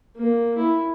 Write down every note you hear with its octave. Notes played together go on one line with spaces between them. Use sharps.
A#3
E4